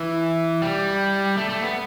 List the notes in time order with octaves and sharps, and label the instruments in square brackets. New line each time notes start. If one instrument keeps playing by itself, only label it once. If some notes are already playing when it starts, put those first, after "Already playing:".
Already playing: [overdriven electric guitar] E3
G3
A3
A3
B3